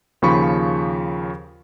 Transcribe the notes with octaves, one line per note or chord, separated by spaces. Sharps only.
D#2 C#3 F3 B5 C#6